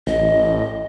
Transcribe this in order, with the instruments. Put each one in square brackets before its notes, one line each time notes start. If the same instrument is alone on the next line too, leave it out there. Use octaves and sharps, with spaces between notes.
[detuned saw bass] A1 [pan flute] D#5